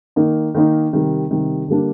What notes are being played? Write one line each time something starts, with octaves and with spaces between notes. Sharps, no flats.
D#3 A#3 D#4
D#3 A#3 D#4
C3 D#3 G3
C3 D#3 G3
D3 G3 A#3 D4